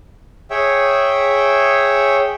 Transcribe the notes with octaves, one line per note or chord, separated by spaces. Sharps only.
G#4 C#5 E5 G5